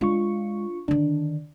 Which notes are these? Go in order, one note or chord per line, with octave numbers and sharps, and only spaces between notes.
G#3 D4 F4 C#6
D3 D#3 D4